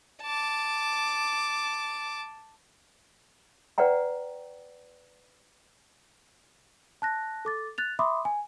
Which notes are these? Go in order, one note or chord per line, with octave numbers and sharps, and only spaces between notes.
A5 D6
B4 D5 F#5 G5 A#5
A5 F#6 A#6
A4 D6 A6
F#6 A6 F7
E5 B5 C6 D6 D#6
G#5